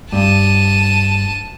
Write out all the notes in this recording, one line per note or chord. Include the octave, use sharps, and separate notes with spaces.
G2 A5 D#7